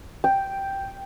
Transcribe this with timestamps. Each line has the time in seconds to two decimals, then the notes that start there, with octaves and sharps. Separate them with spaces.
0.24 G5